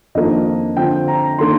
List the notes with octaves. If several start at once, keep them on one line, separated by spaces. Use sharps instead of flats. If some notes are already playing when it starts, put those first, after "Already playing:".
F2 D#3 A#3 D4 D#5
D3 F3 C4 G5
A#5
D#3 A#3 D4 C6